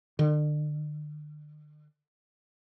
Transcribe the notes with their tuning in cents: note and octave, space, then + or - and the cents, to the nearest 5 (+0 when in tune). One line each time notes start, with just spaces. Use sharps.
D3 +40